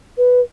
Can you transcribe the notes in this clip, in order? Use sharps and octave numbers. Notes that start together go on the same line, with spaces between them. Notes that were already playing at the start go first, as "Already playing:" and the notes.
B4